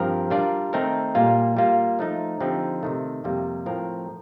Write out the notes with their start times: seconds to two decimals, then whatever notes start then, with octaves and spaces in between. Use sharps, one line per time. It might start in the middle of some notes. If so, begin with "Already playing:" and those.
Already playing: G2 F3 C4 G4 A#4
0.30 G3 D4 F4 A#4 D5
0.73 D#3 A3 C4 D#4 A#4
1.15 A#2 G3 A#3 F4
1.57 G3 A#3 F4
1.99 F3 A3 D#4
2.40 D3 F3 C4 D#4 G4
2.83 C3 D#3 A3
3.24 F2 C3 G3 A#3
3.66 A2 F3 C4 F4 A#4